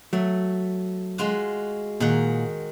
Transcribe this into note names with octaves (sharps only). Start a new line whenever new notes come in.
F#3 A3
G#3 F4 F#4
A#2 D#3 G#4 F#5